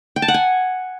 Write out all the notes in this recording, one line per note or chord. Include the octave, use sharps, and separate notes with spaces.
G5
A5
F#5
G#5